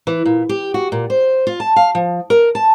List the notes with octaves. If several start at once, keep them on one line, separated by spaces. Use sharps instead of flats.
E3
A#2
G4
F#4
A#2
C5
F4
A5
F5
F3
A#4
A5